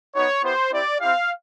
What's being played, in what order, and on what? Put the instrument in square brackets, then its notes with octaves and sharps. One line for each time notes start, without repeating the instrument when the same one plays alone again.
[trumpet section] B3 D#4 F#4 C#5
B3 E4 G4 C5
C4 E4 G4 D5
C4 E4 G4 F5